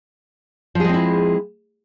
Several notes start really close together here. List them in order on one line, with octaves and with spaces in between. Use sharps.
F3 G#4 G#3 C4 E4